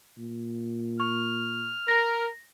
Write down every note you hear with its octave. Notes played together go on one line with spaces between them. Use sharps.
A#2
C#6 F6
A#4 A#6